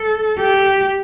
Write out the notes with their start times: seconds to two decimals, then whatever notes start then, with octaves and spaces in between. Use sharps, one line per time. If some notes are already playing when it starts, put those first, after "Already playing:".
Already playing: A4
0.39 G4